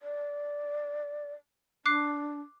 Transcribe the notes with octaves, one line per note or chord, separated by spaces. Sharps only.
D5
D4 D6 F#6 C7